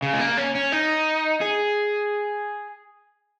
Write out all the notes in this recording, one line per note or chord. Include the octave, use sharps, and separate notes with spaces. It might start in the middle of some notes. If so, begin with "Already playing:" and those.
C#3
G#3
A#3
C#4
C#4
D#4
G#4